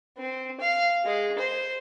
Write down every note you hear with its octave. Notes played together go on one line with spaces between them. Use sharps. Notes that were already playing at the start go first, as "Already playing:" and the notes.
C4
F5
G#3
C5